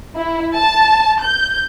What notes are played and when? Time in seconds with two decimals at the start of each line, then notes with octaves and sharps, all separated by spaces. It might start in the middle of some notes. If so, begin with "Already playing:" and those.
0.16 E4
0.57 A5
1.24 G6